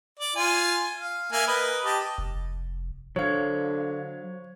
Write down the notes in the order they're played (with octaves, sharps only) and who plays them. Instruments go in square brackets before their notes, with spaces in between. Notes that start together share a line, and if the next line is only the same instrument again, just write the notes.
[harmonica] D5
F4 G#5
F5
A#3 E5 G#5
A#4 B4 D#5
G4 D#5 A5
[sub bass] F1
[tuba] D3 [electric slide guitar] F#3 F5 [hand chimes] C5 G#6 [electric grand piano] C#5